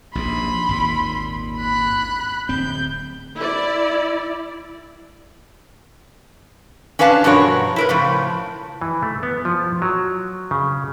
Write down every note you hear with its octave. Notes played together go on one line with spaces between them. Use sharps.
A#1 D#2 B5 C6
G#1 D#2 A#2
B5 F#6
D1 C4 G6
E4 D5
C#4 D4 B4 F5 A5
G2 B2 F3 F#4 A#4 C#5
E4 A#4 B4
A2 C#3 F3
E3
A3
B3
F3
F#3
C#3